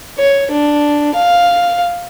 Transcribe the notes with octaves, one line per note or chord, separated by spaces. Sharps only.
C#5
D4
F5